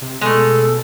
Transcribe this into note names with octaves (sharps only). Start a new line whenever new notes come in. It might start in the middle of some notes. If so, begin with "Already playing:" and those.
C3
B2 G#3 A3 A4